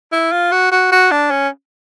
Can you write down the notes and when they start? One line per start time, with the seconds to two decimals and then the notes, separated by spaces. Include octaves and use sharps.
0.12 E4
0.32 F4
0.52 F#4
0.72 F#4
0.92 F#4
1.11 D4
1.31 C#4